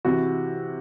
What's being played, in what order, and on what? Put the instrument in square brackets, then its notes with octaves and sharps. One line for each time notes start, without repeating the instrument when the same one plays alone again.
[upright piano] C3 E3 F#4